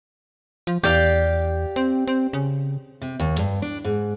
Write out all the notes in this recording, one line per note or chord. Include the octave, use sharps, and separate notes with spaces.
F3
E2 G4 D5 F5
C4
C4
C#3
C3
D#2
G2
D4
G#2